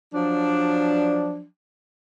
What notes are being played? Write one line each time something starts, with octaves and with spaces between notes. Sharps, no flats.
F3 F#3 D4